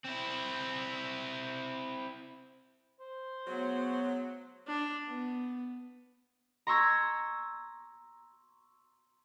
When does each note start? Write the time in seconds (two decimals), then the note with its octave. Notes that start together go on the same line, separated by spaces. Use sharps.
0.05 C4 E4
3.00 C5
3.47 C#3 F#3 A3 B3
4.67 D4
5.09 B3
6.67 A#5 C6 C#6 E6 G#6 A#6